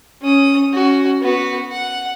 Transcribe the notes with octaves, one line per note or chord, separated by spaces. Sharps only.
C#4 D#6
C#4 F#4
B3 F#4
F#5